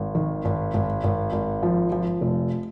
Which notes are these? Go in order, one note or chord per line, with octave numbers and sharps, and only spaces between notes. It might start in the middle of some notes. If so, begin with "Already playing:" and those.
Already playing: G#1
D#3
G#1
G#1
G#1
G#1
F3
F3
F1